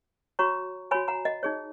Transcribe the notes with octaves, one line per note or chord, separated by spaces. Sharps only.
F#4 C#5 A#5 C#6
F#4 C#5 G#5 B5
F#5 A#5
D#5 F#5
D#4 G#4 C#5